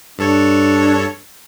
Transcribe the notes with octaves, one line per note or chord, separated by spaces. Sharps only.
G2 D4 A4 C#5